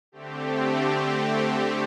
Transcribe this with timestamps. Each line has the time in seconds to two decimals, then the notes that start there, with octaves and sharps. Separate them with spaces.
0.12 D3 A3 C4 G4